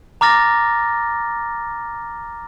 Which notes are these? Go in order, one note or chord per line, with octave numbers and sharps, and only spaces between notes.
A#5 D6 F6 A6 A#6